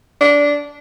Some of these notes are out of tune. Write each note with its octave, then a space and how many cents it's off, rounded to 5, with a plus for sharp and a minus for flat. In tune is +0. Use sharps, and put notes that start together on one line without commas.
D4 -15